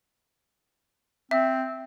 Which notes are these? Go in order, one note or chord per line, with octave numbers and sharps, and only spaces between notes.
C4 E5